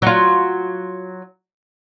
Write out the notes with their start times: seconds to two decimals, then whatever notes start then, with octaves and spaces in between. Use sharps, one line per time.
0.02 F#3 F4